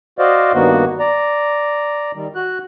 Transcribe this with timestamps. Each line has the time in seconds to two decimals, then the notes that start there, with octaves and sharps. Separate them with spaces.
0.19 F#4 C5 D5 D#5 F5
0.54 G2 D#3 A#3 B3 F#4
1.00 D5 A#5
2.15 D#3 G3
2.35 F#4 F#6